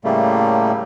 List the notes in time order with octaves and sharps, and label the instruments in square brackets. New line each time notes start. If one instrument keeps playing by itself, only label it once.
[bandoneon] A2 C#3 G3 A3 A#3